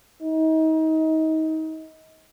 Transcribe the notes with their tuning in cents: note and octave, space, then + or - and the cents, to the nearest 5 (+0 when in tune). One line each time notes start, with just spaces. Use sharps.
D#4 +30